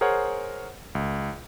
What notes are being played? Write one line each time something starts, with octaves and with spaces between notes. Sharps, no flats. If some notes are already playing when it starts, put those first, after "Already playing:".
G#4 A#4 C5 C#5 F#5
C#2